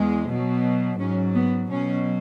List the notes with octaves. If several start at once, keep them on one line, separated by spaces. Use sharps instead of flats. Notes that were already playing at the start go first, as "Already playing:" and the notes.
Already playing: E2 G#3
B2 F#3
G#2 F#3 C#4
B3
B2 F#3 C#4